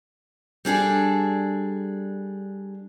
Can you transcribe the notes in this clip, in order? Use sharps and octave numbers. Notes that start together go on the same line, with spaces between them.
G3 D4 G#4 A4